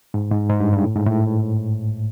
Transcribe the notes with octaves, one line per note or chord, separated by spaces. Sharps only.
G#2
G#2
G#2
G2
G2
A2
G#2
A2